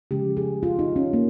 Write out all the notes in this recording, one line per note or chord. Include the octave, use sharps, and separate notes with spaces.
C#3 F3 G#3 G4
G#4
F4
D#4
C#4
A#3